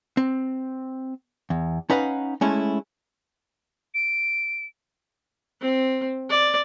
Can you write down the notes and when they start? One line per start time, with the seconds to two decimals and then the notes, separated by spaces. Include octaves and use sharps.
0.17 C4
1.50 E2
1.90 C#4 D#4 B4 F5 F#5
2.41 G#3 A3 C#4 E4
3.94 D7
5.61 C4
6.30 D5